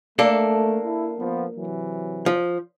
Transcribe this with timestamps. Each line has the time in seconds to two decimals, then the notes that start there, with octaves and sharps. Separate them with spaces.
0.19 A3 A#3 D4 A4
0.84 E4
1.18 F3 B3
1.55 C3 E3 F#3
2.26 F3